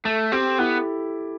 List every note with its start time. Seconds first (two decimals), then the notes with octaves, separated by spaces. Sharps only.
0.04 A3 A4
0.32 C4 G4
0.58 B3 E4